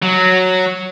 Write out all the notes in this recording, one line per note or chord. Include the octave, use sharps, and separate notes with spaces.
F#3